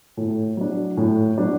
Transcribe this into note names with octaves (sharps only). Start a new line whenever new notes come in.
A2
F#3 D4
A2
F#3 D4